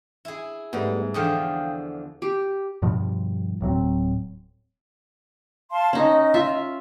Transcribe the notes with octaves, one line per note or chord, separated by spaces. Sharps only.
E4 G#4
G#2 G3 A3 B3
E2 D3 F3 F5 G5 D#6
G4
G2 B2 F3 G3
D1 A2 F#3 C4
F5 A5 C6
C#4 D#4 D#5
F4 E5